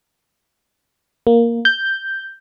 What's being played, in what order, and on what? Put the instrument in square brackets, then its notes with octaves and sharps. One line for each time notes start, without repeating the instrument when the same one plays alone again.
[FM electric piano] A#3
G6